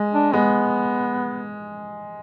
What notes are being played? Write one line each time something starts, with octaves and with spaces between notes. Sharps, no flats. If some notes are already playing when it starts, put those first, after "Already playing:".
Already playing: G#3
D4
G#3 B3